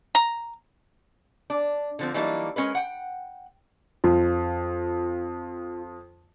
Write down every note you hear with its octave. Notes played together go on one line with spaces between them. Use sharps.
A#5
D4
D3 F3 C4
E3 F#3 G3 A#3 D4 D#4
G#3 C#4 A#4 B4
F#5 G5
F2 F4